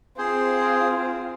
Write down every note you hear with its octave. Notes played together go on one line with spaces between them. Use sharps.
C4 F4 G#4 C5